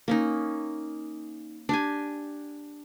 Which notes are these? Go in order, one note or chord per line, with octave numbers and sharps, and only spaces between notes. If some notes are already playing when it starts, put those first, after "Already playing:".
A#3 C#4 D#4
D4 G4 G#5